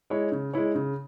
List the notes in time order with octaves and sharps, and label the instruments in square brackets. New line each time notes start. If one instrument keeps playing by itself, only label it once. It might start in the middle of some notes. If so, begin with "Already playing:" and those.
[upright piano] G#3 E4 C#5
C#3
G#3 E4 C#5
C#3